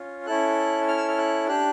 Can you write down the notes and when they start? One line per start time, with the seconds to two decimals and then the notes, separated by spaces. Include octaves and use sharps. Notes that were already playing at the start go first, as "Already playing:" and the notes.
Already playing: C#4 F4
0.26 C#4 E4 A4 F#6
0.88 F6
0.97 E6
1.08 F6
1.18 F#6
1.47 D4 G4 F#6